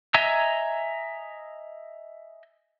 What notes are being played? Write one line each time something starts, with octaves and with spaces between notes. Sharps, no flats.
D#5 E5 G#5 A#5 E6